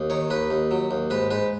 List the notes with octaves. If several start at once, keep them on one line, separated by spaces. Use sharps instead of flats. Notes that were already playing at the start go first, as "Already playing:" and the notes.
Already playing: D#2
D#3 C#5
D#2 B4
D#2
F#3
D#2
G#2 B4
G#2 B4